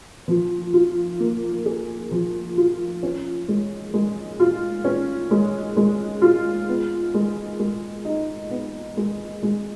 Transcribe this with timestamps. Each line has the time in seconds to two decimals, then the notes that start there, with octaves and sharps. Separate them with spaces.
0.28 F3
0.73 F4
1.20 A#3
1.66 G#4
2.11 F3
2.57 F4
3.03 C#4
3.48 G#3
3.94 G#3
4.40 F4
4.85 C#4
5.31 G#3
5.77 G#3
6.22 F4
6.69 B3
7.14 G#3
7.59 G#3
8.05 D#4
8.50 B3
8.97 G#3
9.43 G#3